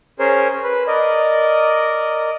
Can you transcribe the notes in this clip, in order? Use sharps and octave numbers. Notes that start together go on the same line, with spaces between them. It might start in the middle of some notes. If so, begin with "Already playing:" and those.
C#4 G#4 A#4 C5 C#5
B4
A#4 D5 D#5